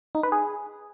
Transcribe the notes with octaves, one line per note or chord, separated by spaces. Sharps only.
D#4
B4
G#4